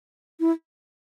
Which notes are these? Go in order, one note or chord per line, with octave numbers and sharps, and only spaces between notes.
E4